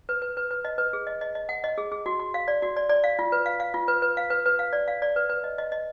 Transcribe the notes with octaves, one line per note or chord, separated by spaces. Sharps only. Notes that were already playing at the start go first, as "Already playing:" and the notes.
B4
B4
B4
B4
D#5
B4
G#4
D#5
D#5
D#5
F#5
D#5
G#4
G#4
F#4
F#4
F5
D5
F#4
D5
D5
F5
F4
B4
F5
F5
F4
B4
B4
F5
B4
B4
F5
D5
F5
D5
B4
B4
D#5
D#5
D#5